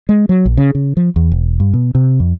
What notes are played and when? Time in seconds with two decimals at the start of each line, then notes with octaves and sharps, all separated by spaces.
0.09 G#3
0.29 F#3
0.45 A#1
0.57 C#3
0.75 C#3
0.97 F3
1.16 E2
1.32 E1
1.60 G2
1.74 B2
1.95 C3
2.20 F2